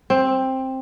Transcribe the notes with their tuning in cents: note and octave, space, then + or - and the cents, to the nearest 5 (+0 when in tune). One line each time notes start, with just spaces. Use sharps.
C4 +10